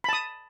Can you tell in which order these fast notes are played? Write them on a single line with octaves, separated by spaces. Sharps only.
B5 A5 D#6